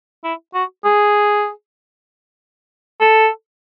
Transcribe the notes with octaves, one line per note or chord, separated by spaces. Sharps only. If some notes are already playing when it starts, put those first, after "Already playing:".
E4
F#4
G#4
A4